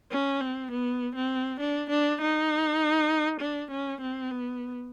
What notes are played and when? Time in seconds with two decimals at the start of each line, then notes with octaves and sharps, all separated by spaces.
0.11 C#4
0.41 C4
0.71 B3
1.16 C4
1.60 D4
1.90 D4
2.21 D#4
3.40 D4
3.71 C#4
4.01 C4
4.31 B3